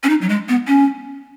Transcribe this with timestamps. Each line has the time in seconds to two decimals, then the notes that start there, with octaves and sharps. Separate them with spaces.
0.03 C#4
0.09 D#4
0.21 F#3
0.29 G#3
0.49 B3
0.67 C#4